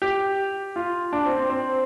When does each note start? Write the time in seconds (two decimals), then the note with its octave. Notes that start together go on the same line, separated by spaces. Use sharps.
0.02 G4
0.76 F4
1.13 D4
1.25 C4
1.36 C4
1.50 C4